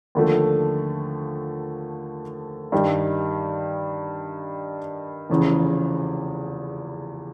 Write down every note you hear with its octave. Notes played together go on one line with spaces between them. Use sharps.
D#2 D3 F3 A3
G2 D#3 G3
F1 E2 C#3 E3